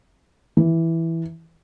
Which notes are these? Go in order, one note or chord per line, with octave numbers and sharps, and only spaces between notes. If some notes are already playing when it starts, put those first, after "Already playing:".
E3